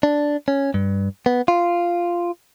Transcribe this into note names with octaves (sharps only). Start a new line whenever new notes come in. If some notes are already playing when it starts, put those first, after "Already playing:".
D4
C#4
G2
B3
F4